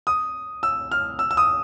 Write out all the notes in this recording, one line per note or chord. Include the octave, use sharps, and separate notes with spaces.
D#6
E6
F6
E6
E6
D#6